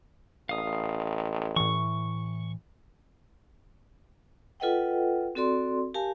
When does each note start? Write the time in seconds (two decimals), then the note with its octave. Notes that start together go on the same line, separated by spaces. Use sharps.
0.49 A1 F5 D#6
1.56 A2 E3 C#6
4.60 F4 A4 B4 D#5 F#5 G5
5.35 C4 F#4 A4 D5 C6
5.94 G4 A#4 F5 G#5 A5